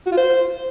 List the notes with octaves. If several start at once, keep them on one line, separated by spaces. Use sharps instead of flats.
F#4
F4
C5